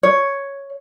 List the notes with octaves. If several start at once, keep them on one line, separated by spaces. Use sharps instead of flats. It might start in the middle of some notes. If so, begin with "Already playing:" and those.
C#5